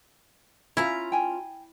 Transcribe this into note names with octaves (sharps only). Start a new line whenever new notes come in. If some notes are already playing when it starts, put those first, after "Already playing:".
C#4 E4 F4 A#5
G5 G#5